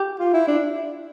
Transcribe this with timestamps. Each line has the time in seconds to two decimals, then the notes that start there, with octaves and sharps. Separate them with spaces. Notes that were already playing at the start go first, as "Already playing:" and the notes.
Already playing: G4
0.20 F4
0.34 E4
0.48 D4